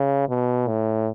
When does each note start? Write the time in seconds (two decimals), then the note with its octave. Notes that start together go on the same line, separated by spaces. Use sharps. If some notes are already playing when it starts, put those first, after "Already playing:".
Already playing: C#3
0.29 B2
0.68 A2